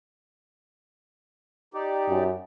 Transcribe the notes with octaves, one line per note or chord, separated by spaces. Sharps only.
D#4 G4 D5
F#2